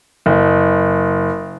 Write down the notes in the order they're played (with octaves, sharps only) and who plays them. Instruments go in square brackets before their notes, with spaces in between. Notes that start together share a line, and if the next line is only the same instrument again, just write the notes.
[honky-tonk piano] F#1